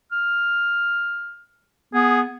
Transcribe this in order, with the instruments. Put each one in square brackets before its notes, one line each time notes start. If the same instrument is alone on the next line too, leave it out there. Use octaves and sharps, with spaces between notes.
[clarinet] F6
[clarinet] B3 [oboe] G#4